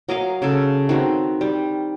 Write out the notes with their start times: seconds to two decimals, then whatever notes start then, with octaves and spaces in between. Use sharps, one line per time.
0.09 F#3 A#4 D#5 F5
0.42 C#3 A4
0.89 D#3 C4 F#4
1.41 G3